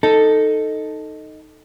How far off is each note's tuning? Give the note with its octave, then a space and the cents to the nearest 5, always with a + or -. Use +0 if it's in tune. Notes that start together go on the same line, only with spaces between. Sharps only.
D#4 +0 A4 +5